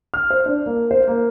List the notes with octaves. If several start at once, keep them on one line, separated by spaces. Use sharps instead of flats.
F6
C5
D4
A#3
C5
A#3